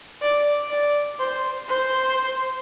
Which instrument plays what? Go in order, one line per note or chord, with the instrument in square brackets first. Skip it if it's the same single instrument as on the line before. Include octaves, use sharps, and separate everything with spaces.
[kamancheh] D5
D5
C5
C5